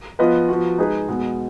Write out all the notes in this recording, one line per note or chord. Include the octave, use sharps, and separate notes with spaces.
F3 B3 F4 B4 D#5
F3 B3 F#4
G#3 D#4 G#4 B4
B2 G#3 B3